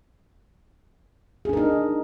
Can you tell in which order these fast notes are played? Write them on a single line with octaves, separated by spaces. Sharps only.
G#4 D4 A#4 D#4